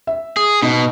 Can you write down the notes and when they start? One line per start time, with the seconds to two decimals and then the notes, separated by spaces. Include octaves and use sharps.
0.07 E5
0.37 G#4
0.62 B2 D#4